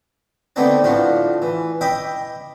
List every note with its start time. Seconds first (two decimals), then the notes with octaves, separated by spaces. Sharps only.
0.56 D3 A3 B3 C4 D#4 D5
0.84 A2 F3 A3 D4 F#4
1.42 E3
1.81 D#5 E5 G5 B5 D6